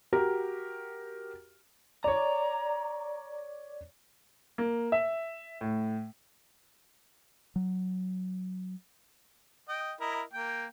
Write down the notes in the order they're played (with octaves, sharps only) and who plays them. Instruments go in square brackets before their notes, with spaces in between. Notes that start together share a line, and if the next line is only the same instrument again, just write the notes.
[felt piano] F#4 G4 A#4
[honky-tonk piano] C#5 D5 [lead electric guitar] A#5
[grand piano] A#3
E5
A2
[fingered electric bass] F#3
[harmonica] D#5 G5
E4 A#4 D#5
A#3 G5